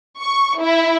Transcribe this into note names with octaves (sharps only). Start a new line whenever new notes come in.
C#6
E4